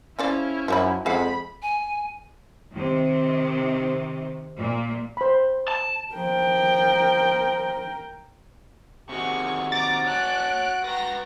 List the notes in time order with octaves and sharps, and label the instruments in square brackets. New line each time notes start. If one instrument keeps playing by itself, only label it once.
[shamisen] C#3 F3 D5 [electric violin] C#4 E4
[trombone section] F#2 [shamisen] F3 D#4 B5
[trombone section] F2 G#3 [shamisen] G#4 F5 F#5 [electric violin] B5
[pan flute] G#5
[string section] C3 D#3
A#2
[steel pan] C5 B5
[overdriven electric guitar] A5
[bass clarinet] F3 [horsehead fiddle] A#4 G5
[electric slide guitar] C3 D#3 [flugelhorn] F#4 [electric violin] G#4 C#6
[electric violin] A#5 D6 [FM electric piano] A6
[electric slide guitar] C#5 G#5 A5 [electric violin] F#6 D7
[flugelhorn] F#4 [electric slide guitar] B4 G5 [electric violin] A#5 A#6